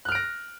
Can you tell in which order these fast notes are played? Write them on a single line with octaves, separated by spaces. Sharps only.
F#6 F6 D7 A#6